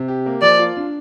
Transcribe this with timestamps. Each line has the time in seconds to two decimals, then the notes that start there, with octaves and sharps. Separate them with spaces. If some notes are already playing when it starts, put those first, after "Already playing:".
Already playing: C3
0.08 G4
0.26 A#3
0.42 F3 D5
0.59 F4
0.77 D4